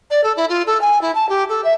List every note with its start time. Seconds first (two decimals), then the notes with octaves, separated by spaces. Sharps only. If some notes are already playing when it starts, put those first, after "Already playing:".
0.11 D5
0.24 A4
0.37 E4
0.49 F4
0.67 A4
0.81 G#5
1.01 E4
1.15 A5
1.29 G4
1.49 A4
1.64 E5